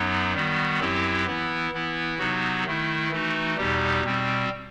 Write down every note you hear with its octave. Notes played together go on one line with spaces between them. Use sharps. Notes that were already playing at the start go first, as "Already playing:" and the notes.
Already playing: F#2 F#3 B3 D#4
D#3 G3 B3 F#4
F#2 F#3 C4 E4 G4
E3 B3 E4
E3 B3 E4
C3 F#3 B3 D#4 F#4
D#3 A3 E4
E3 A3 D#4 F#4
E2 B2 G3 D#4 G4
B2 G3 C4